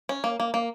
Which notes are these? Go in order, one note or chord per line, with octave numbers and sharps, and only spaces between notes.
C#4
A#3
A#3
A#3